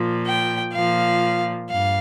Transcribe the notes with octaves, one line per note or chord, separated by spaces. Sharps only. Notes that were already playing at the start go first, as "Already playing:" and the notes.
Already playing: A#2 F3
G5
A#2 F3 F5
G2 F5